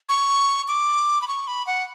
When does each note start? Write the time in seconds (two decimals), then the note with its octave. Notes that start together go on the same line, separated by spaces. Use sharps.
0.09 C#6
0.68 D6
1.22 B5
1.28 C#6
1.47 B5
1.67 F#5